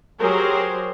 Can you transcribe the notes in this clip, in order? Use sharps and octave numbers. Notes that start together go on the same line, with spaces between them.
F#3 G4 G#4 A#4 C5